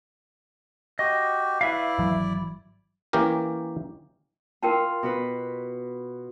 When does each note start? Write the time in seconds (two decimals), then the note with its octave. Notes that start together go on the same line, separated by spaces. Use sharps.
0.99 F#4 G4 D#5
1.61 E4 B4 D5 E5 F5
1.99 G#1 E3 F#3
3.13 E3 A#3 C#4 G4 A#4
4.63 F4 A#4 G5 A5
5.03 B2 F#4 B4